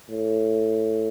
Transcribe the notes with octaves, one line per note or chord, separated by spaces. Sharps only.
A2